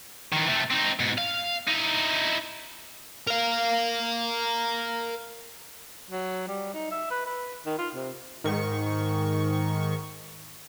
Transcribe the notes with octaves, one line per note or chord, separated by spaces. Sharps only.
D#3 E3
C3 A3
C4 D#4
G#2 B2
F5
D#4 E4
A#4 F5
F#3
G3
D#4
E5
B4
B4
D#3
F4
C3
G#2 D#3 C#6